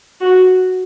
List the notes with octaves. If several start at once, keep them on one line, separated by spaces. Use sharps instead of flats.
F#4